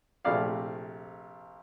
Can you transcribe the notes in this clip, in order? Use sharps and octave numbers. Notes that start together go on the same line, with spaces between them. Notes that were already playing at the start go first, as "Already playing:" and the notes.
A#1 C3 A3 D5 F5